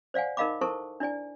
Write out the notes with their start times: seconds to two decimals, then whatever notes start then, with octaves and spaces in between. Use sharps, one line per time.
0.14 C5 D5 F5 F#5 G#5
0.37 D#4 A#4 D#5 F5 B5 D6
0.61 E4 A4 A#4 C5 A5 C#6
1.00 D4 E4 D5 G#5